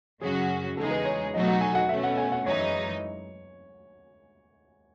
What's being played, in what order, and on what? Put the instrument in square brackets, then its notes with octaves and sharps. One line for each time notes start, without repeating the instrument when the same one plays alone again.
[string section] F#2 C#3 F#3 C#4 F#4 [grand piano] G#4
[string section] E2 C#3 G#3 D#4 G#4 [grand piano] A4
[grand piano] B4
C#5
[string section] B2 F#3 A3 D#4 F#4 [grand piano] D#5
[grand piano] F#5
G#5
F#5
[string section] B2 A3 C#4 [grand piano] E5
[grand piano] F#5
G#5
F#5
[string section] F#2 E3 G#3 D#4 [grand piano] C#5